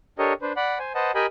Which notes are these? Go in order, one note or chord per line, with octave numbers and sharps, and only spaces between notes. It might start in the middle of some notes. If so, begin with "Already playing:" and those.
D4 G4 A4 A#4 C#5 D#5
D4 B4 C5
D5 F#5 B5
C5 G#5
B4 C5 D#5 F#5 A5
G4 A#4 D#5 G5 G#5 B5